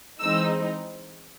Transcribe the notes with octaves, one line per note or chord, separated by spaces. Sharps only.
E3 G#3 C4 D#4 E6